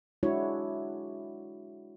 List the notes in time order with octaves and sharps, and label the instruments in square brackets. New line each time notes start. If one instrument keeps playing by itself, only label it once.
[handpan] G#3 D4 E4 F#4 C#5